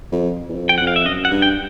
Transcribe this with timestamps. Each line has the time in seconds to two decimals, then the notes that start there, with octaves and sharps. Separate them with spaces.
0.12 F2
0.49 E2
0.55 F2
0.69 G5
0.78 F2 F#5
0.87 F5
0.96 E5
1.05 F#2 D#5
1.25 F#5
1.31 G2
1.42 G5